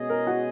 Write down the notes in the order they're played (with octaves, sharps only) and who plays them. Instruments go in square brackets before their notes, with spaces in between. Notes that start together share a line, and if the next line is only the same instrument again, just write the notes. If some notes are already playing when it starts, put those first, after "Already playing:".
Already playing: [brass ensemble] B2 G#3 C#4 G#4 D#5
[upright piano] A#4
F#4